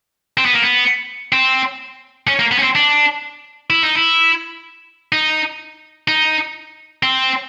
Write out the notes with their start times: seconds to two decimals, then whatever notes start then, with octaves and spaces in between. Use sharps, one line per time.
0.37 C4
0.46 B3
0.54 A#3
0.62 B3
1.32 C4
2.27 C#4
2.39 A#3
2.52 B3
2.59 C#4
2.63 C4
2.75 D4
3.70 E4
3.82 D#4
3.95 E4
5.12 D#4
6.08 D#4
7.03 C4